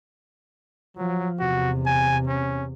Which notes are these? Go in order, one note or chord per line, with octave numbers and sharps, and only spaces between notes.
F3 F#3
E2 C3 F#4
G#5
C#4